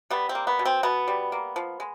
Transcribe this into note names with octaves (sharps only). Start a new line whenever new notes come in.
G3 B3
C4
A#3
B3
B2
C4
B2 B3
G3
A#3
F3
G#3